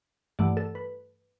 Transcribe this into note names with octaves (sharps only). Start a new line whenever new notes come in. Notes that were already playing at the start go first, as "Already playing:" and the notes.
G2 E3 A3 D5 F#5
A4
B4